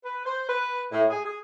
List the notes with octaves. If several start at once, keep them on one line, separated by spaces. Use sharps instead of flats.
B4
C5
B4
A2
G#4
G#4